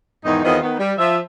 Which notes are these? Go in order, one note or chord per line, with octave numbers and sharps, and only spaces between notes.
E2 G#2 D#3 D#4
E2 D#3 B3 C4 F4 D#5
D#3 B3
G3
F3 E5